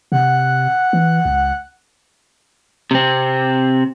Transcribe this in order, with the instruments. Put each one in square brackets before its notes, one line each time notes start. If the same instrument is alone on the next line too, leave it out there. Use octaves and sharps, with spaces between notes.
[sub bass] C3 [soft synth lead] F#5
[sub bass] E3
C#2
[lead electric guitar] C3 C4